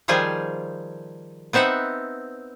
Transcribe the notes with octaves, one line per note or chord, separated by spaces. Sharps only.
D#3 F3 G3 F4 G#4 G#5
B3 C4 D#4 E5 F#5